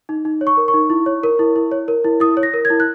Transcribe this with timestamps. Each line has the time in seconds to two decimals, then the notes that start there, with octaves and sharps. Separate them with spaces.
0.09 D#4
0.25 D#4
0.41 C#5
0.47 C#6
0.57 A#4
0.68 C#6
0.74 D#4
0.90 E4
1.06 C#5
1.23 A#4
1.39 E4
1.56 E4
1.71 C#5
1.88 A#4
2.04 E4
2.20 E4 D#6
2.37 C#5
2.43 A#6
2.54 A#4
2.65 G#6
2.70 E4
2.80 F#6